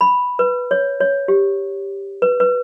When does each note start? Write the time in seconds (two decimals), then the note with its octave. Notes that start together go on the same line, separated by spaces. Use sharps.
0.01 B5
0.39 B4
0.71 C#5
1.00 C#5
1.28 G4
2.22 B4
2.40 B4